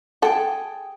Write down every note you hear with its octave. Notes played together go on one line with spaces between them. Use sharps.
G#4 A4 F#5 G5